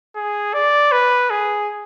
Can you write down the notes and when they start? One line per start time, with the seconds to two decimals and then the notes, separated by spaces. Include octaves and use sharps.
0.16 G#4
0.54 D5
0.92 B4
1.30 G#4